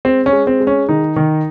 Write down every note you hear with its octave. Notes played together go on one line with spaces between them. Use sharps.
G#3 C4
C#4
G#3
C4
G#3
C#4
D#3 D#4
D#3